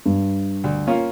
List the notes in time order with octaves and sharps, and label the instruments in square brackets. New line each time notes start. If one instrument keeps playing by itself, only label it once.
[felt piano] G2
[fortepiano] D2
A#3 C#4 F4